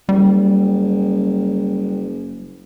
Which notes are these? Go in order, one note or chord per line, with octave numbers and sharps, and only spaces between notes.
F#1 G3